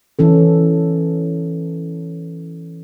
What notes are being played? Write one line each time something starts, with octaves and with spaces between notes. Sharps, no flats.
E3 C#4 A4